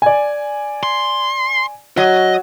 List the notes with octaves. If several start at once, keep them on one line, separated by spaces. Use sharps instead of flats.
D5 G#5
C6
F#3 D#5